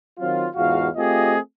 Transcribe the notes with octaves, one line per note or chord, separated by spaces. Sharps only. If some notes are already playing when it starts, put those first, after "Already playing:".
D#3 F#3 C4 F4
E2 G#2 F4 F#4 F5
A3 C4 F4 G4 G#4 D#5